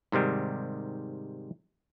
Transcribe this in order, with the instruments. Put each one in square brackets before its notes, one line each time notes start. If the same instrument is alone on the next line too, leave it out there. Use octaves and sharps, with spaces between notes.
[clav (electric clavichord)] G#2 C3 D#3 G3